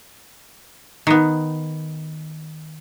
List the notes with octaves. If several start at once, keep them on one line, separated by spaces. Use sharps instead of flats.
D#3 B3